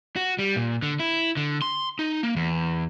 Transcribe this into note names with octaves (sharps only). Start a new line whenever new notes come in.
F#4
G3
A#2
D3
E4
D3
C6
D#4
A#3
E2